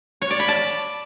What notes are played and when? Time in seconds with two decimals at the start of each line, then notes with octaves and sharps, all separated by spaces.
0.22 C#5
0.30 D5
0.39 B5
0.48 A5